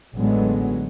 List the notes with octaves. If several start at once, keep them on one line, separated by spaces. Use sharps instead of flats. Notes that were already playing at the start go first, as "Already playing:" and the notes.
A1 D3 F#3 G#3 B3